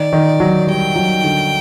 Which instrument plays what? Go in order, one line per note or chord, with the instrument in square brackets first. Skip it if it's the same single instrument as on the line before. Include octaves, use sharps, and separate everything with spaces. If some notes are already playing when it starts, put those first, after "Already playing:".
Already playing: [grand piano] D#3 [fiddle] D5
[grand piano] D#3
F#3
[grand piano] G3 [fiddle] G5
[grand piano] F#3
D3